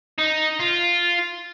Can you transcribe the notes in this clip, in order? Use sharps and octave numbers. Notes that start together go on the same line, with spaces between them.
D#4
F4